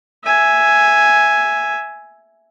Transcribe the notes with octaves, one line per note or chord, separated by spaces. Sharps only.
E5 G#5